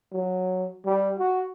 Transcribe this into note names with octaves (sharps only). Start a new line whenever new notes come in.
F#3
G3
F#4